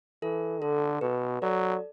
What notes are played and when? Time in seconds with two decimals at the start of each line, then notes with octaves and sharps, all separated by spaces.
0.22 E3 A4
0.61 D3 A4
1.01 B2 B4
1.42 F#3 A4 D5